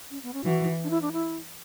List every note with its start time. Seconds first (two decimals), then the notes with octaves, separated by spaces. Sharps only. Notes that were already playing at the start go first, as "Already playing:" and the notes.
0.10 C#4
0.23 B3
0.33 C#4
0.44 E3 F#4
0.84 D4
0.90 E4
1.02 D4
1.12 E4